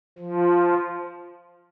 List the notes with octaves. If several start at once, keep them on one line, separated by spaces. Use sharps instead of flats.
F3